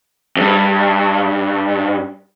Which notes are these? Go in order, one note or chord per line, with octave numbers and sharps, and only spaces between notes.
E2 G2